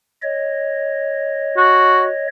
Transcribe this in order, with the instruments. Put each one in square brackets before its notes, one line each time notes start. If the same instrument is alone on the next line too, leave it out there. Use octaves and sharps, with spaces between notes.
[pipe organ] C#5 D#5
[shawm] F#4